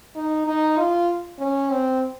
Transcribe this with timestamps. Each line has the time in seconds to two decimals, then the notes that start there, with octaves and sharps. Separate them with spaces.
0.16 D#4
0.47 D#4
0.78 F4
1.39 C#4
1.70 C4